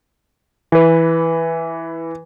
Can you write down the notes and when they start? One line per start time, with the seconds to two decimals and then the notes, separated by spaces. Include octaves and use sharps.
0.72 E3 B4